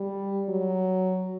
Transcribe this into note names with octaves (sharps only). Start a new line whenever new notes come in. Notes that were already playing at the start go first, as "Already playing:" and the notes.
Already playing: G3
F#3